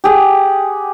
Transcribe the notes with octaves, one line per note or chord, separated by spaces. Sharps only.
G4 G#4 F#5